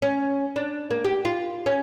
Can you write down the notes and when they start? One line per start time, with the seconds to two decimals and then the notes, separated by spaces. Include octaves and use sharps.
0.02 C#4
0.56 D4
0.91 A#3
1.05 G4
1.25 F4
1.66 C#4